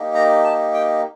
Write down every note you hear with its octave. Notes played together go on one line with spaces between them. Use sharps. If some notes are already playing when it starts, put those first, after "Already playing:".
Already playing: A#3 D#4 G4
A#5
A5
G5